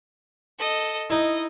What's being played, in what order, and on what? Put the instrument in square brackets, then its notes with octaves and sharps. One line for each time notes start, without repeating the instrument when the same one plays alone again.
[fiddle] A4 D#5
[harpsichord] D#4 E4 [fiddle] D#5